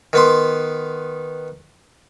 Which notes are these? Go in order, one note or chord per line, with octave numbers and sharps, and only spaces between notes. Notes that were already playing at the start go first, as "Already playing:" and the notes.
D#3 B3 C6